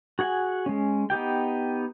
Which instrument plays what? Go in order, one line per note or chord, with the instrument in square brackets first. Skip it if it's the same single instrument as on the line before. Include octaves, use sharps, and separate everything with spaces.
[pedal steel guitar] F#4 G#4 F#5 G#5
G#3 C#4
B3 D#4 G4 G5